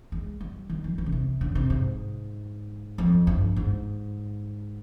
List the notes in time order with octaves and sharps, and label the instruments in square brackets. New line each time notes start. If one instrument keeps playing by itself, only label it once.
[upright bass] G#3
G3
D#3
F3
G3
D3
C3
D3
C3
G#2
F2
G2
G#2